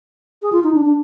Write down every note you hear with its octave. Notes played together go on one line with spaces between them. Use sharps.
G#4
F4
D#4
D4
D4